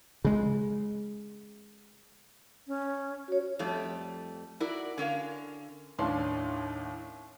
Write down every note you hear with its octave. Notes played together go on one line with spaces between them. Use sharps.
C#3 G#3
C#4
F#4 C#5
F2 G3 A3
E4 F#4 A#4 D5
D3 C#4 A#4 F5
D#2 A2 C#4 D4 F5 C6